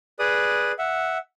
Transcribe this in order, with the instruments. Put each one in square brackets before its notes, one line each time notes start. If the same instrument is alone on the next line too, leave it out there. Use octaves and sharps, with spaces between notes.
[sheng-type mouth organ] G#4 B4 D5 D#6
E5 F#5